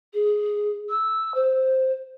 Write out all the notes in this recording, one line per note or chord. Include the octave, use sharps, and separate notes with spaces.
G#4
E6
C5